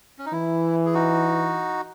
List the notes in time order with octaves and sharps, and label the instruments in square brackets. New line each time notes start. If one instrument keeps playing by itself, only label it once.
[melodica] C#4
D#4
[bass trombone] E3 [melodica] E4
[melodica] G#4
D#4 F#4